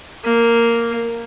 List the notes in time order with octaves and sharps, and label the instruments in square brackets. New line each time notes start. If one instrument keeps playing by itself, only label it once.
[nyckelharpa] A#3